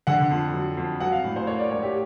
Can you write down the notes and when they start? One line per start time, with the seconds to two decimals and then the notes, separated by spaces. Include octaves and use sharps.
0.07 D3 F#5
0.30 F2
0.53 F#3
0.77 F2
1.00 F#3 F#5
1.12 F5
1.24 A2
1.36 C5
1.47 A#3 C#5
1.59 D5
1.71 A2 C#5
1.83 G4